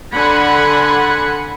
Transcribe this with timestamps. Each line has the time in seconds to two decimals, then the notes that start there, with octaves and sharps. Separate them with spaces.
0.14 D3 F#5 G#5 B5 C6